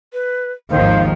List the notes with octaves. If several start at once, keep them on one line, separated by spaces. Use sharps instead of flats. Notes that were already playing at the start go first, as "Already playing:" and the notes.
B4
G#1 D#2 D#3 F3 C5 F5